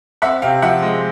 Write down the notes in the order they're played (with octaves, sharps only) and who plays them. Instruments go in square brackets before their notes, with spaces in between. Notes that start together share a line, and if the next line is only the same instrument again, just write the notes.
[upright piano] C4 E5 F#5
C3 F5 G5
F3 E5 F#5
G#3